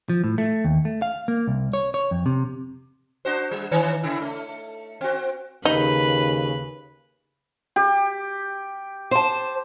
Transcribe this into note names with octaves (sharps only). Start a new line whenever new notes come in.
F3
A2
A3
D#2
A3
F5
A#3
C2
C#5
C#5
F2
C3
D4 F#4 C5
G3
D#3 E3 C#5
C#3 E4
A3
C4 F#4
D#2 C#3 D#4 B4
G4
C5 A5